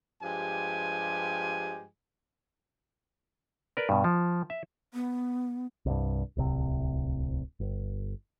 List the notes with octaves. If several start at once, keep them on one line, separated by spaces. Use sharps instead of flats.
G2 F3 G#3 G4 G#5
A#4 B4 D5
G2 B2
F3
E5
B3
C2 G2
D1 C2 C3
G1